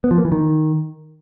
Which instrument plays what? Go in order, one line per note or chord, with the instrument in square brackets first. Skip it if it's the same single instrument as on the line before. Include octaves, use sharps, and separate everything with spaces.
[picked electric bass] B3
F3
A#3
E3
D#3